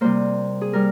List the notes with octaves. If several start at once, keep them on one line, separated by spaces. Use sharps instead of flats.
C3 G3 A#3 C5
G#4
G3 A#4